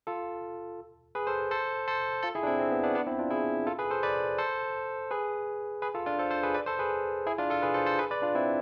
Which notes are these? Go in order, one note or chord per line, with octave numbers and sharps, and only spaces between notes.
F4 A4
G#4 B4
A4 C5
A4 C5
A4 C5
F4 A4
E4 G#4
D4
C4 E4
C4
B3
B3 D4
B3 D4
C4 E4
D4 F4
E4 G#4
F4 A4
G#4 B4
A4 C5
B4 D5
A4 C5
G#4 B4
G#4 B4
F4 A4
D4 F4
A4 C5
A4 C5
G#4 B4
B4 D5
A4 C5
G#4 B4
E4 G#4
D4 F4
F4 A4
G#4 B4
A4 C5
A4 C5
G#4 B4
B4 D5
D4 F4
C4 E4